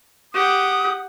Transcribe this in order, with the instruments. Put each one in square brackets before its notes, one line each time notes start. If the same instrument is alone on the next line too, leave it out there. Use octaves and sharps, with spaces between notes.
[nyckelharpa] G4 F#5 [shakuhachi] D#6